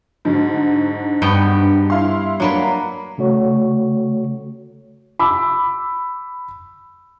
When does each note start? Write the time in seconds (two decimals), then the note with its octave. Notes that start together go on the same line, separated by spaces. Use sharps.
0.25 G#2 D3 F#3
1.22 G2 B3 G5
1.90 E4 F5 C6
2.40 F#3 A#3 D4 B4
3.18 C#3 A3 F#4 C#5
5.19 B5 D6 E6